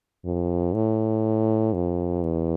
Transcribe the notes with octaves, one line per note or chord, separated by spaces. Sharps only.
F2
A2
F2
E2